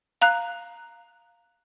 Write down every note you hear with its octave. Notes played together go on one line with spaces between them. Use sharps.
F5 A#5 F#6